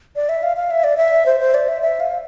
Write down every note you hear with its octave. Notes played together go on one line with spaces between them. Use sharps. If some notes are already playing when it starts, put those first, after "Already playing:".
D5
E5
F5
F5
E5
D5
E5
C5
C5
D5
E5
E5
F5